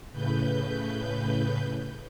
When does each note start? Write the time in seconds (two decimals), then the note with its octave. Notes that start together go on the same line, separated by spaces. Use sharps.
0.12 A2 C#3 B4 G6